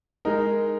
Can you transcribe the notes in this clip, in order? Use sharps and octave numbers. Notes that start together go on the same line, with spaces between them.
G#3 D#4 A#4